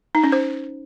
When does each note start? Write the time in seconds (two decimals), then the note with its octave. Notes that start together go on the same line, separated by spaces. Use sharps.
0.15 D#4
0.24 C#4
0.32 C5